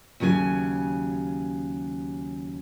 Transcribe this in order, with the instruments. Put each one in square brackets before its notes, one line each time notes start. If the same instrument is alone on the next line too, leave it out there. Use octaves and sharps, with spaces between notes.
[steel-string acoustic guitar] D#2 C#3 F#3 G#4 G#5